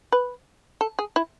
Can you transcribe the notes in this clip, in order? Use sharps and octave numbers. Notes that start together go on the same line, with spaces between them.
B4
A4
G#4
E4